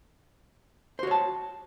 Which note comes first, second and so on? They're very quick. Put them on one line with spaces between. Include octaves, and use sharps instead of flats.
C5 F#4 C#5 A5